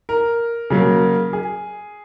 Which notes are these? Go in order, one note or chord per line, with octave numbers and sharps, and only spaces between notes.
A#4
C#3 F#3 A#3
G#4